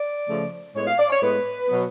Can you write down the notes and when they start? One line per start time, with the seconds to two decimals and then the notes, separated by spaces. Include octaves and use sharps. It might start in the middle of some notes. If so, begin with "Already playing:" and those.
Already playing: D5
0.29 C#3 F3 A3
0.75 A2 G#3 B3 C#5
0.87 F5
0.99 D5
1.10 C#5
1.22 A2 G#3 B3 B4
1.68 B2 F#3 B3